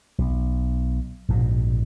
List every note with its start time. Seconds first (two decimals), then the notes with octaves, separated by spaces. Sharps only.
0.18 B1
1.28 A#1 G#2 B2